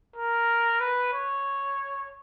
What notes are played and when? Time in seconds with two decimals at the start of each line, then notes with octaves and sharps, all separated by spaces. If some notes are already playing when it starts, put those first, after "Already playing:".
0.16 A#4
0.80 B4
1.13 C#5